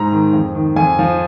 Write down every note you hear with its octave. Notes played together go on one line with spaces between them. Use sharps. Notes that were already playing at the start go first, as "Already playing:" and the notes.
Already playing: G#2 A#5
D#3
F2
D#3
F2 G#5
F3